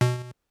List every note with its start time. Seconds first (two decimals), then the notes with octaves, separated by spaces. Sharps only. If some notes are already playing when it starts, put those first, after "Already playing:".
0.01 B2